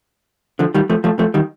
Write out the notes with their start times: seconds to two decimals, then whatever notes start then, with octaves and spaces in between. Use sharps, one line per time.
0.59 D3 F3
0.74 D#3 G3
0.90 F3 A3
1.04 F3 A3
1.19 F3 A3
1.34 D#3 G3